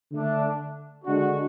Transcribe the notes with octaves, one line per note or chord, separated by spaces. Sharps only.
D3 A3 D4
D3 G#3 D4 F#4